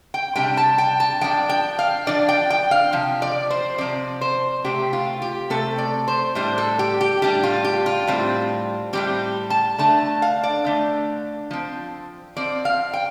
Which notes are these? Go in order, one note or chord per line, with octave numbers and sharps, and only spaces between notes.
G5
C3 G3 D4 G5
A5
G5
A5
F3 D4 G5
G5
F5
F3 D4 D5
G5
G5
F5
C3 F3
D5
C5
C3 F3 C4 D5
C5
C3 A3 C4 G4
F4
G4
C3 A3 C4 A4
D5
C5
A2 G3 D4 C5
A4
G4
G4
A2 G3 D4 G4
F4
G4
F4
A2 G3 C4
A2 G3 C4 G4
A5
D3 A3 D4 A5
F5
D5
D3 A3 D4
F3 C4
F3 C4 D5
F5
G5